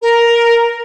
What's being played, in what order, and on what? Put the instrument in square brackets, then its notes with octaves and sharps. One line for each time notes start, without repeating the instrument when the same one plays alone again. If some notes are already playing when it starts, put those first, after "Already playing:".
[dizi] A#4